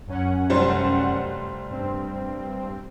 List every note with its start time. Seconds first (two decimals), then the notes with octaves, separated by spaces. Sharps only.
0.07 F#2 C#4 F#5
0.50 F1 G3 C5
1.70 G2 C4